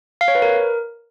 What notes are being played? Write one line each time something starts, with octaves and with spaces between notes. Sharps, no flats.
F5
C#5
B4
A#4